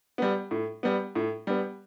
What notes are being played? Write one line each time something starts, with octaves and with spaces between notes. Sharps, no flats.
G3 B3
A2
G3 B3
A2
G3 B3